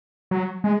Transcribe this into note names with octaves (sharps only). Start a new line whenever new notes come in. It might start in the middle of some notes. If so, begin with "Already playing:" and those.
F#3
G#3